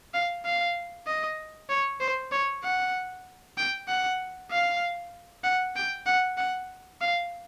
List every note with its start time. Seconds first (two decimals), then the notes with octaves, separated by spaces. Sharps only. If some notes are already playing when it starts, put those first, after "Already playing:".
0.14 F5
0.45 F5
1.07 D#5
1.69 C#5
2.00 C5
2.32 C#5
2.64 F#5
3.58 G5
3.88 F#5
4.51 F5
5.44 F#5
5.76 G5
6.06 F#5
6.38 F#5
7.01 F5